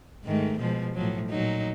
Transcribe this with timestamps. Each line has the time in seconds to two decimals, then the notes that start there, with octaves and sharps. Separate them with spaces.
0.24 G#2 D#3 A3
0.59 B2 F3 G#3
0.94 A2 F3 F#3
1.30 A#2 F#3 D#4